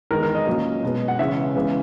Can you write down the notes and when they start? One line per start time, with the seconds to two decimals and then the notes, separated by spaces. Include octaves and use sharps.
0.11 E2 D#3 G#3 B3 A#4
0.23 A#4
0.35 D#5
0.47 A#2 F#3 A#3 C#4
0.83 B2 G#3 B3
1.08 F#5
1.19 C#3 E3 G#3 C#4 E5
1.55 C#3 E3 G#3 B3